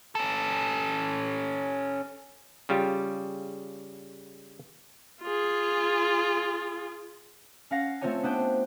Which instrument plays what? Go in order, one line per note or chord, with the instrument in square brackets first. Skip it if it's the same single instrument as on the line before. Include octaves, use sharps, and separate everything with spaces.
[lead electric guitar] C#4 A4
[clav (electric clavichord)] C#3 G3 F4 G4
[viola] F4 G#4
[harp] C#4 F5 F#5 A#6 C7
A3 C4 F4 C5 C#5 G#5
B3 D4 C5 G5